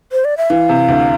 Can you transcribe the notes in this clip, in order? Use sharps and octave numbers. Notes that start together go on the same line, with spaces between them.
C5
D5
E5
E3 F5
C3
D2